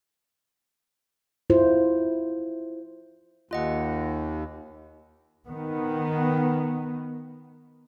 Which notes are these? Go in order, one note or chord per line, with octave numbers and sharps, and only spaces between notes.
E4 F4 C5
D#2 F4 D#5 F#5
D#3 B3